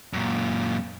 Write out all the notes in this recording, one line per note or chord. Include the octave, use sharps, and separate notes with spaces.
F#2 A#2